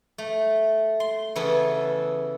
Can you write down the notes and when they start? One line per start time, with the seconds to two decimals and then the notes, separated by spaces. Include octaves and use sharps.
0.18 A3
1.00 C6
1.36 C#3 E3 B3 G#4 A4